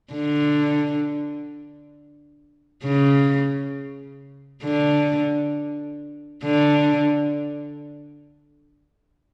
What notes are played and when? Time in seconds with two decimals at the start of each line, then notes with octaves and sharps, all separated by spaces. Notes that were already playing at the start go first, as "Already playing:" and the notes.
0.13 D3
2.84 C#3
4.64 D3
6.44 D3